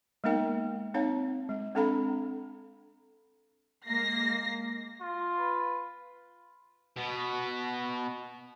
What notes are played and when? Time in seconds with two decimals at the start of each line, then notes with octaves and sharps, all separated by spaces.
0.24 G#3 A#3 B3 D#4 A#4 G5
0.94 C4 D#4 C#5 F5 A5
1.49 G#3
1.75 C4 D4 A4 F5 A#5 B5
3.87 G#3 A#3 A#6 C7
5.01 F4
5.38 B4
6.97 B2 B3